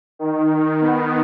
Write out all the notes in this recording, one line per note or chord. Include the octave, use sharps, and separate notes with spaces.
D#3
B3